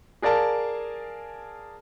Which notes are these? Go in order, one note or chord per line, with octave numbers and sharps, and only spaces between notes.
G#4 A#4 D5 F5 A5